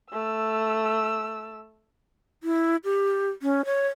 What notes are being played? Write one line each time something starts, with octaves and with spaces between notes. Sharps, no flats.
A3 E6
E4
G4
C#4
C#5